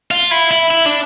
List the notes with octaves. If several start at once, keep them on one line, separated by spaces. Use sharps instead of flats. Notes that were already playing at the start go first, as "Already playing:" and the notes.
F4
E4
E4
E4
D4